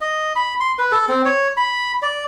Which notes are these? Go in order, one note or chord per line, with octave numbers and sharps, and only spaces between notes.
D#5
B5
C6
B4
A4
C4
C#5
B5
D5